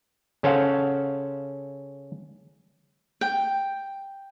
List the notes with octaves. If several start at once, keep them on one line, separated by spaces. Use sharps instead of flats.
C#3 C#4 A4 C5 F5 F#5
G5